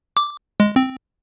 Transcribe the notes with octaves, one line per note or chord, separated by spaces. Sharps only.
D6
G#3
C4